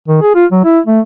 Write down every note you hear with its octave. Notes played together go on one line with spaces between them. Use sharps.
D#3
G#4
F4
F#3
E4
A3